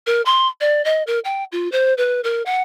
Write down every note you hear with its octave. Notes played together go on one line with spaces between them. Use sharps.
A#4
C6
D5
D#5
A#4
G5
F4
C5
B4
A#4
F#5